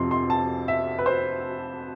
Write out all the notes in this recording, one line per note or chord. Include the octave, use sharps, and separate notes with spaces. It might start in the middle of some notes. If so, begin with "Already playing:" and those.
Already playing: F2 C3 F3 C6
C6
A5
E5
B4
C5